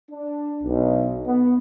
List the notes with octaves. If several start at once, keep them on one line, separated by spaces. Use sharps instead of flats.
D4
B1
B3